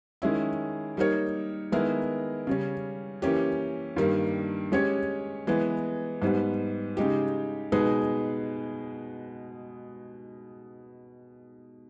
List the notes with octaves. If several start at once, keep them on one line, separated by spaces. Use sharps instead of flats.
D#3 G#3 C#4 E4
G3 A#3 D#4 A#4 C#5
D#3 G#3 B3 E4 A#4
C#3 G3 C#4
E3 A#3 C#4 G4
G2 D#3 G3 A#3
G#3 C#4 G4 C#5
E3 G#3 B3
G#2 G3 B3
C#3 G#3 D#4 G4
B2 G#3 D#4 G#4 B4